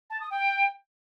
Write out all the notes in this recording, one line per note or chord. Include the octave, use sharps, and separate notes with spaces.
A5
D#6
G5